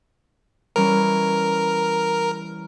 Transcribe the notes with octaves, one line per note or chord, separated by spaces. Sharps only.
E3 G3 C#4 A#4